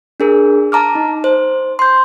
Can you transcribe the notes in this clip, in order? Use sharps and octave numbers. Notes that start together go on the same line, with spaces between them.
D4 G#4 A#4
A5 A#5 D6 F6
D#4
C5
C6 G6